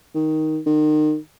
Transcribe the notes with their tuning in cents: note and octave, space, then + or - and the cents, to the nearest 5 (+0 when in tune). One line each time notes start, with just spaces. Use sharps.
D#3 +5
D#3 -30